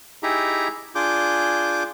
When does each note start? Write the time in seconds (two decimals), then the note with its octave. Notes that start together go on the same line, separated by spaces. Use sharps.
0.23 D#4 E4 G4 G#4 E5 A#5
0.95 D4 F4 G#4 D6 G6